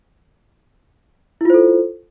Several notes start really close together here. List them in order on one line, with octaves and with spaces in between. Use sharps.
E4 F4 C5 A4